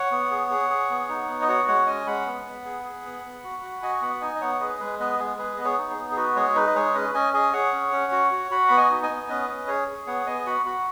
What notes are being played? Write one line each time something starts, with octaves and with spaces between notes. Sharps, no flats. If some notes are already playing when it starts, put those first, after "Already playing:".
Already playing: C#5 F#5
B3
G#4
G#4
G#4
B3
D#4
B3
D#5
F#4 C#5 F#5
G#3 C#5 F#5
C#4 D#5 G#5
G#3 F#5 B5
B3
B3
G#4
G#4
B3
B3
F#4
F#4
F#4 D#5 G#5
B3 F#5 B5
D#4 D#5 G#5
D#5
B3 C#5 F#5
G#4 B4 D#5
G#3 B4
B3 B4 D#5
G#3 G#4
G#4 B4
B3 D#5
G#4 C#5
D#4
G#4
B3
G#4
F#4 B4
G#3 G#4 C#5
D#4 B4
D#5
G#3 G#4 C#5
C#4 B4 D#5
C#4 D#5 G#5
G#4 D#5 G#5
G#4 C#5 F#5
C#4
C#4
F#4
F#4
F#4 F#5 B5
B3 B5
D#5 G#5
D#4
D#5 G#5
B3
C#4 B4 D#5
C#4
G#4 C#5
G#4
B3 C#5 F#5
B3 D#5 G#5
F#4 F#5 B5
F#4 F#5 B5